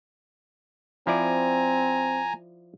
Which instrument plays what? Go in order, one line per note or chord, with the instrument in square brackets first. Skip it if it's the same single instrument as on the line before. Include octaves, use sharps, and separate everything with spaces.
[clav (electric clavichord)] F3 E4 D5 [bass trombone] C4 [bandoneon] G#5 A#5